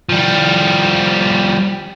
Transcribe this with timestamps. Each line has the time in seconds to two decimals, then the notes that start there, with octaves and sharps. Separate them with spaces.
0.09 F3 G3